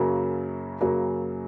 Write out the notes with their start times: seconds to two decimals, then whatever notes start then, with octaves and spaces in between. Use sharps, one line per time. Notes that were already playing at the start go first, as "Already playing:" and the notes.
Already playing: F#2 C#3 F#3 A#3
0.81 F#2 C#3 F#3 A#3